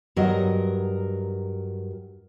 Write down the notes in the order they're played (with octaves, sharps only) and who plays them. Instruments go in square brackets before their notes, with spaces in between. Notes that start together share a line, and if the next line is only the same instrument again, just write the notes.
[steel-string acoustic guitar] G2 F#3 A#4 D#5